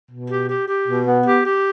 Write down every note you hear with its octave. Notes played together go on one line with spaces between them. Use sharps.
B2
G4
G4
G4
B2
B3
G4
G4